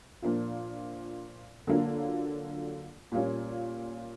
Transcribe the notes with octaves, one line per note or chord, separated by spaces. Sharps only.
A#2 F3 A#3 D4 F4
D3 F#3 A#3 D4 F4
A#2 G3 A#3 C#4 F4